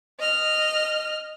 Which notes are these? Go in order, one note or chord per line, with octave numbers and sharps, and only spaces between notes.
D#5 F6